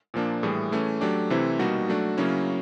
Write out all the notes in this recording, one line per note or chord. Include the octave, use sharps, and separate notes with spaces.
A#2 F3 A#3 D4
A2 E3 G3 G#4
E3 A3 C#4
F#3 A3 D4 G4
C3 E3 A3 C4 E4
B2 G3 A#3 D#4 F#4
F#3 A3 D4
C#3 F#3 A#3 C#4 E4